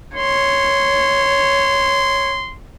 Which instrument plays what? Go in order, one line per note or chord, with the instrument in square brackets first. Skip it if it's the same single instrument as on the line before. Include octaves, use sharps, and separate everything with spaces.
[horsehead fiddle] C#5 [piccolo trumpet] C6